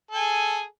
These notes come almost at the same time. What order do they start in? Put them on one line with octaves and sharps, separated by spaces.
A4 G#5 G#4